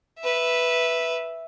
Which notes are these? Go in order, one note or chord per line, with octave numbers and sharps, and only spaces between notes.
B4 E5